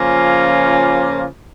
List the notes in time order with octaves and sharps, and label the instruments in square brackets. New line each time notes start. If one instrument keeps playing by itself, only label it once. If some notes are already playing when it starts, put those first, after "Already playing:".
Already playing: [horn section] C#3 F3 A#3 C#4 F4